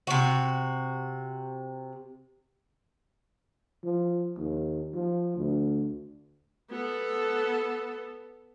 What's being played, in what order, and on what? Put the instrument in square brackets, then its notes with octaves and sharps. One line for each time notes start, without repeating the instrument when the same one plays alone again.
[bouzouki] C3 F#4
[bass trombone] F3
D#2
F3
D2
[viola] B3 A4